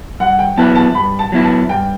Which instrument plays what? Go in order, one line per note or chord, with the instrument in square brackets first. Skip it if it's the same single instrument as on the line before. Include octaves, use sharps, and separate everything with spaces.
[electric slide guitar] G2 [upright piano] F#5
[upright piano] G5
[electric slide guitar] F#3 B3 E4 B4 [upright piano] A5
[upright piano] A5
[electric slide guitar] G2 [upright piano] B5
[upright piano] A5
[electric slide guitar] F#3 B3 E4 B4
[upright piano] A5
[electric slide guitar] G2 [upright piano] G5